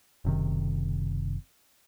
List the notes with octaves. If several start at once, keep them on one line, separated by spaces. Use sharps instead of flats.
F#1 C3 D#3